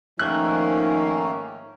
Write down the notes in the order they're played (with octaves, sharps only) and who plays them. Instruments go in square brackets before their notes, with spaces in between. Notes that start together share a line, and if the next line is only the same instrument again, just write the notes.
[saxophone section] G#2 A#3 [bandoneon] D#3 A3 C#4 [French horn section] F3 D#4 [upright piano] F#6